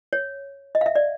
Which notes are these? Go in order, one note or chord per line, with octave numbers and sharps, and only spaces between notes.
C#5
D#5
F5
E5
D5